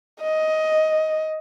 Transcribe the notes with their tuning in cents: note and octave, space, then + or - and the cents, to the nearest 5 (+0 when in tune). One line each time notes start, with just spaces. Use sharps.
D#5 +10